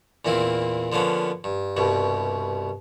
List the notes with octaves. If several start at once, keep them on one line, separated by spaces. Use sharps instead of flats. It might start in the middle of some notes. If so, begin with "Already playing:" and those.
E2 A#2 A#3 C4 E4
D3 F3 A#3 B3 C#4
G2
C2 G2 B2